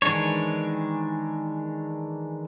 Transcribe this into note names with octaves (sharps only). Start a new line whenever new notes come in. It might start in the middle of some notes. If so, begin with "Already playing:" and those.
D#3 E3 G#3 D4 C#5